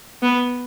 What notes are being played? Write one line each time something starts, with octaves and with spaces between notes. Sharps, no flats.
B3